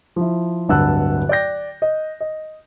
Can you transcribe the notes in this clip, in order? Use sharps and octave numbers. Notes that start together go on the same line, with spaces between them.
F3 E4
D1 G2 F#5 A5 E6 F#6
D5 G5 G6 A#6
D#5
D#5